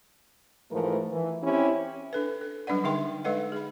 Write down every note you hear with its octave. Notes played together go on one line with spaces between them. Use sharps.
G#2 E3 F3 A3 A#4
E3
C4 C#4 E4 G4
D4 A4 B4
A4
F#3 G3 D4 B4 D5 F#5
D3 D#4 G#4 E5 G5 C6
G#3 D#4 A4 B4 D#5 F#5
G#4 B5